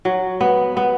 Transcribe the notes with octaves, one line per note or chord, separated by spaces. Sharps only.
F#3
B3
B3